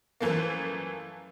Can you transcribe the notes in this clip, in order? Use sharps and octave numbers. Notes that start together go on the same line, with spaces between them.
F#2 E3 F3 A3 A#3